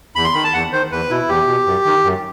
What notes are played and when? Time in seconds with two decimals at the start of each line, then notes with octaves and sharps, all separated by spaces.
0.15 E2 B5
0.24 C6
0.34 D#3 B5
0.44 A5
0.53 E2 F#5
0.72 D#3 C5
0.91 E2 B4
1.10 B2 E4
1.29 E2 G4
1.47 B2
1.66 F#2
1.85 D#3
2.04 F#2